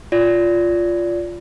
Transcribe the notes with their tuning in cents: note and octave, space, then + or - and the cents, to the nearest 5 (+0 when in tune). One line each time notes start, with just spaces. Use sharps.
F4 -5 D5 -20